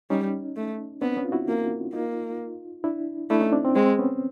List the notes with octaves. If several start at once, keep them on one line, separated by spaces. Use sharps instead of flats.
G3 C#4 D#4
A3
B3 C4 D4
B3 C#4
F4
E4 F#4
A#3
A#3 D#4 F4
D4 E4
A3 D4 E4
C#4 D#4
C4 D4
C4
G#3 C4
B3 C#4